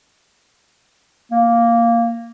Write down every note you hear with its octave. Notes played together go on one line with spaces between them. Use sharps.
A#3